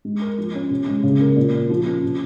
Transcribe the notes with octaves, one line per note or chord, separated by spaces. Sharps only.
G#3
A#4
F3
C#4
C3
G#3
C#3
A#3
A#2
A#3
F3
C#4
C3